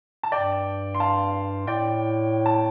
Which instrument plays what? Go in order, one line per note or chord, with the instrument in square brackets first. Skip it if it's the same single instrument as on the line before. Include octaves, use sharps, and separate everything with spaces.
[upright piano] A5
[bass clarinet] G2 [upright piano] D5 G5
[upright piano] C6
F5 A5
[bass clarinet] A2 [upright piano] D5 G5
[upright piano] A5